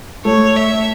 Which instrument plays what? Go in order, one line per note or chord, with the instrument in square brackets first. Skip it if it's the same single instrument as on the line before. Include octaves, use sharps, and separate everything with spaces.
[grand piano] A3 [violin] C#5
[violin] E5